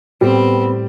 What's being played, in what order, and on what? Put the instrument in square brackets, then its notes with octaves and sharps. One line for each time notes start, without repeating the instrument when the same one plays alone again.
[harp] A2 [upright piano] G3 [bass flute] B3 [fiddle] C4